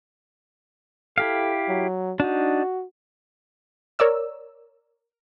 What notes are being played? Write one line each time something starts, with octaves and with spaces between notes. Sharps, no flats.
E4 G4 A4 F5
F#3
D4 D#4 F#4
A#4 C#5 D5 E6